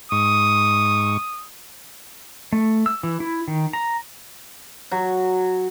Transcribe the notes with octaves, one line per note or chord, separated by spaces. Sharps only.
G#2 C#6 D#6
A3
E6
E3
E4
D#3
A#5
F#3